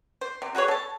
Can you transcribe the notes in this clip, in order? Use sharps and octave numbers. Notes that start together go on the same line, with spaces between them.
C5
C3
F#4 G#4 B4 C#5
A4 A5